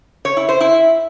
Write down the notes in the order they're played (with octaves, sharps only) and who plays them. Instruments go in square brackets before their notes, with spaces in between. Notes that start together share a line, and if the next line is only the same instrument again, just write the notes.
[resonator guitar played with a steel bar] C#5
E4
C5
E4